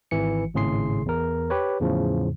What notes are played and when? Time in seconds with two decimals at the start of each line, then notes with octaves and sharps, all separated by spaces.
0.11 G#1 E3 C#7
0.54 G#1 A2 C#3 G#4 C6 C7
1.06 E2 A#4
1.50 G4 B4 C#5
1.80 E2 A2 C#3 F3